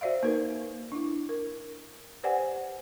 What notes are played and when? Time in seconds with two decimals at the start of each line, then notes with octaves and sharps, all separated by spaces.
0.01 F#4 C5 D5 E5 F5
0.23 A#3 D#4 A#4 B4
0.92 D4 E4
1.29 A#4
2.23 G4 B4 C5 D5 F#5 G#5